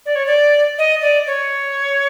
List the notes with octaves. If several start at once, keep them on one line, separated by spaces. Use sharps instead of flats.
D5
C#5
D5
D#5
D5
C#5